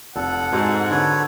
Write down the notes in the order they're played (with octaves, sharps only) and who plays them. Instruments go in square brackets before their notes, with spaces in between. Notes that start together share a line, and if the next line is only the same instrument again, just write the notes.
[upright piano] F1 [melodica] A4 [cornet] F#5
[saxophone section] G#2 [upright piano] F#4
[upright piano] D3 [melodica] A4 B4 C#5